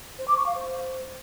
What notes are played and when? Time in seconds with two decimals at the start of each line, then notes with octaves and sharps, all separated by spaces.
0.19 C5
0.28 D6
0.37 C#6
0.46 F5
0.55 C5